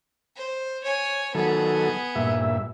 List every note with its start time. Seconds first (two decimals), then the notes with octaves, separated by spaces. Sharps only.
0.36 C5
0.84 C#5 G#5
1.35 D#3 F#3 B3 G#4 A4
2.15 G2 A#2 E5